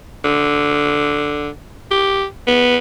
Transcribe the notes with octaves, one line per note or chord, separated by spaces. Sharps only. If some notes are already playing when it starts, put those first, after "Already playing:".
D3
G4
B3